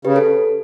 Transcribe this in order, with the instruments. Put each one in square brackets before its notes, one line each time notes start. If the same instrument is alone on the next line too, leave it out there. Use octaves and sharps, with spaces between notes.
[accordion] C#3 [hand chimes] G4 B4
[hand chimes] A4